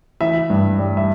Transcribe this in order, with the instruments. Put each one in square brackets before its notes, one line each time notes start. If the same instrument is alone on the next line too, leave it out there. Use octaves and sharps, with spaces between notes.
[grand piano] E3 E5
G2
G3
E5